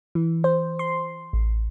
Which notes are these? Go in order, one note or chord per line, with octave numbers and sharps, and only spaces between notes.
E3
C5
C6
A1